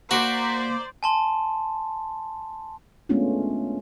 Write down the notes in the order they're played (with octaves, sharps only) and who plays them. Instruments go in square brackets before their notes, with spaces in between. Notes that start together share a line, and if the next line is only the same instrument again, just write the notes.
[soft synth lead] A#3 [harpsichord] F#4 [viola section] C5 D5 [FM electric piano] A#5 D6 B6
[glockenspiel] G#5 A5 C6
[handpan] G#3 A3 B3 C#4 D4 F4